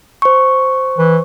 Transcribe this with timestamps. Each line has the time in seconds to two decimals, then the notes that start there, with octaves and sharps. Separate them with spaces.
0.22 C5 C#6
0.98 E3